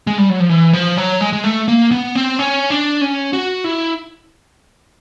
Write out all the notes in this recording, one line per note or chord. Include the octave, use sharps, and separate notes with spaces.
G#3
G3
F#3
F3
E3
F3
F#3
G#3
G#3
A3
A#3
B3
C4
C#4
D4
C#4
F#4
E4